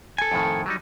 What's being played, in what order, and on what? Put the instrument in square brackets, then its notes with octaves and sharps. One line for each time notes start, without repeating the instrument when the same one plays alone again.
[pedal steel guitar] A4 G#5
[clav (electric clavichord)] F2 A2 D#3
F#3 G3 D#4